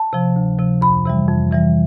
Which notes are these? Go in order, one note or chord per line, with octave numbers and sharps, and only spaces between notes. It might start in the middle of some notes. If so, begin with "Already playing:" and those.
Already playing: A5
C3 F3
D2
C3 F3
F2 B5
C3 E3 G3
F2
C3 E3 G3